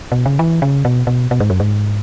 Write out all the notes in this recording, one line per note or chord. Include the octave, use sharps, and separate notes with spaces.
B2
C#3
E3
C#3
B2
B2
B2
G#2
F#2
G#2